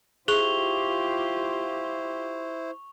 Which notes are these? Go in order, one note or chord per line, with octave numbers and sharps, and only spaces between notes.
E4 F4 G4 G#4 C5 C#6 F7 G7